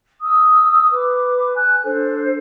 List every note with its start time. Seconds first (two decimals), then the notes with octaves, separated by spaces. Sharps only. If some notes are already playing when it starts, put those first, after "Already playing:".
0.22 D#6 E6
0.92 B4 D6
1.56 G#5 F#6
1.84 D4 A4 C5